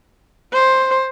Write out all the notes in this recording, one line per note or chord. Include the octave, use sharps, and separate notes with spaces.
C5